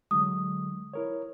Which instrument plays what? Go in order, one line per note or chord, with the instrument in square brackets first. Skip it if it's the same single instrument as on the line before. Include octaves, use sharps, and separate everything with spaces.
[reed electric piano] D3 F#3 G#3 [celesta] D#6
[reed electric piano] E4 A#4 C#5